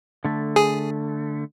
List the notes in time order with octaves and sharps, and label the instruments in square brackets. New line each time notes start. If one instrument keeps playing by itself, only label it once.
[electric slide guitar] D3 A3
[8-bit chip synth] G#4